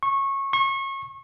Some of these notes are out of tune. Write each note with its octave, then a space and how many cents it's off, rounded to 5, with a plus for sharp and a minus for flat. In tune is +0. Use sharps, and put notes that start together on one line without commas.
C#6 -20
C#6 -30